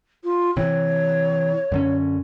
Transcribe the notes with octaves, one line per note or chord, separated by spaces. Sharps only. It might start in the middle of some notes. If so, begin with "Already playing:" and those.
F4
C3 E3 C#5
F#2 D3 C#4